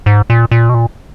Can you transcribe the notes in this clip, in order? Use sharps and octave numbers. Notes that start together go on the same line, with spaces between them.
G#2
A#2
A#2
B2
A#2